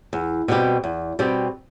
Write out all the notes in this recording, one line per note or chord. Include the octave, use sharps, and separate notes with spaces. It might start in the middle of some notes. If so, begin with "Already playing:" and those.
E2
B2 G3 C4 G4
E2
B2 G3 C4 G4